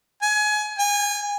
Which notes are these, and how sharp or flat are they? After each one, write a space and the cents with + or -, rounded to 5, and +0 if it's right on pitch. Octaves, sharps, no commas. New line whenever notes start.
G#5 +25
G#5 -30